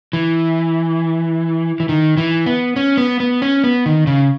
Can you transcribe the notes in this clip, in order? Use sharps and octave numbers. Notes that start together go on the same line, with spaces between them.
E3
E3
D#3
E3
B3
C#4
B3
B3
C#4
B3
D#3
C#3